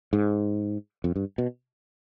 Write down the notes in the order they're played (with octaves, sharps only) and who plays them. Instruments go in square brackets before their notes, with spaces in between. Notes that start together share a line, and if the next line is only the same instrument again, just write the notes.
[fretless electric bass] G#2
F2
G2
B2